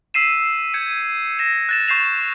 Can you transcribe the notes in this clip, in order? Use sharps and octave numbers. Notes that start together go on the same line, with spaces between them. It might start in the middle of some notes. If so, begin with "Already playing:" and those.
E6 B6 C7 D#7 E7
G6 G#6 C#7 D#7
A#6 E7
F#6 A6 E7
C#6 G6 C7 E7 F7